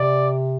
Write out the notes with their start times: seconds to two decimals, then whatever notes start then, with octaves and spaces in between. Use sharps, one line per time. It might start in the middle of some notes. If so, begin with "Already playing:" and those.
Already playing: C3 D5